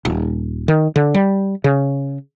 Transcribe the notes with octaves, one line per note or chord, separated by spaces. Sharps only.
D#1
D#3
D3
G3
C#3